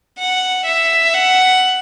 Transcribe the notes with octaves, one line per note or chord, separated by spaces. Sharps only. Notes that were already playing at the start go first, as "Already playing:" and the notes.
F#5
E5
F#5